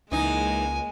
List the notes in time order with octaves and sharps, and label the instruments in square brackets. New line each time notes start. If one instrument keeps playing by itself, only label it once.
[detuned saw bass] C#2 [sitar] E3 D#4 [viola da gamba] G#3 A#3 [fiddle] G#5